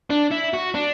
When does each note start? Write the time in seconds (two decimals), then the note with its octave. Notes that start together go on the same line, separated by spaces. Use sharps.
0.10 D4
0.31 E4
0.54 F#4
0.75 D4